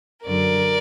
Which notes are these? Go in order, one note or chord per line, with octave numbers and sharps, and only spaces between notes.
F#2 D3 F#3 A#4 D5